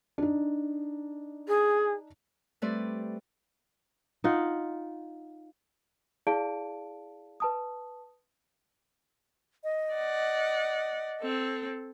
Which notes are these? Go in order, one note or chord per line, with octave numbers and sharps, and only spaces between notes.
D4 D#4
G#4
G3 A3 C4 B4 D5
D#4 F4 F#5
E4 G#4 D5 F5 A5 D7
B4 A5 D#6
D#5
D5 F#5
C4 A4